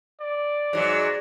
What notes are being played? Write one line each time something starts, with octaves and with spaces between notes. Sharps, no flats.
D5
G#2 F#3